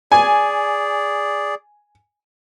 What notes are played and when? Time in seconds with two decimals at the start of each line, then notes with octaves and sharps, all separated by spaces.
0.12 G#4 D5 G#5